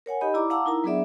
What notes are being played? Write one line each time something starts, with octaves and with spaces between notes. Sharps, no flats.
A#4 C#5 F#5 G#5
D#4 G4 D#5 B5
E4 D5 A#5 D6
F5 F#5 A5 A#5 D6 E6
D#4 E4 A#4 A#5
F#3 B3 D4 G#4 D5 E5